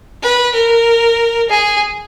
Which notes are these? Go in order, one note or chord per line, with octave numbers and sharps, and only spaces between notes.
B4
A#4
G#4